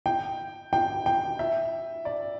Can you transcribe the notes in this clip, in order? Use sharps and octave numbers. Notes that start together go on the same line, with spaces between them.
G5
G5
G5
E5
D5